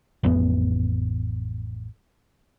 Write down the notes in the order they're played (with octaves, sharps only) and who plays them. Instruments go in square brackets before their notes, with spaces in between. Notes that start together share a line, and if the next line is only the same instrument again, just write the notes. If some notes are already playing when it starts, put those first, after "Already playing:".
[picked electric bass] A1 F2 B3